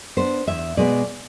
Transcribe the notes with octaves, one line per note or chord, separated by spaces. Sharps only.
B3 D4 C5
E2 E5
B2 G#3 B3 D5